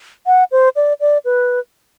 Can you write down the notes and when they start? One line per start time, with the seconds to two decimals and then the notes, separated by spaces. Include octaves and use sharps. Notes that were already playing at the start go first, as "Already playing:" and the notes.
0.27 F#5
0.52 C5
0.76 D5
1.01 D5
1.25 B4